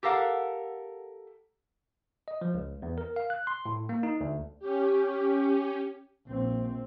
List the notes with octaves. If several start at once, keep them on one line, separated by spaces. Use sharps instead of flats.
G4 A4 A#4 F5 F#5
D#5
F3
C#2
E2
A#4
F5
F#6
C6
A2
A#3
D#4
D2
C#4 G4
A#1 C4